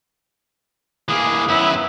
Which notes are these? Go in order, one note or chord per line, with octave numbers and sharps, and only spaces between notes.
E3 A#3 G#4
F#2 B3 E4